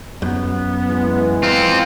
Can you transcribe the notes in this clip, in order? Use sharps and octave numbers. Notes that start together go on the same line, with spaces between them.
F#2 B3
E3 G#3
C4 F4